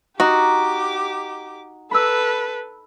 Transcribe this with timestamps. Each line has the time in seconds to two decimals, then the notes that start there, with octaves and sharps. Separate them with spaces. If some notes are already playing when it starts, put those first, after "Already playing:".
0.20 D#4 F#4 G4 D6
1.91 A4 B4 B5 E6